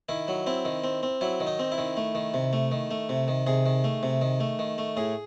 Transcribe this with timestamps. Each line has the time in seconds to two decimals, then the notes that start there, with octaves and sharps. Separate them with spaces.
0.09 D#3 E4
0.28 F#3
0.46 C4 E4
0.65 D#3
0.84 C4
1.03 C4
1.21 F#3 E4
1.40 D#3
1.47 D#4
1.59 C4
1.72 E4
1.78 D#3
1.97 A3
2.15 D#3
2.34 C3
2.53 A3
2.72 D#3
2.91 A3
3.09 C3
3.28 D#3
3.47 C3 G#4
3.66 D#3
3.84 A3
4.03 C3
4.21 D#3
4.40 A3
4.59 D#3
4.78 A3
4.97 A2 G#4